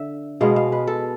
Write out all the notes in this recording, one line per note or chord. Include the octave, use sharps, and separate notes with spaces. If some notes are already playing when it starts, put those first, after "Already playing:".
Already playing: D3 E5
B2 G#3 B3 F5
F5
B4
A4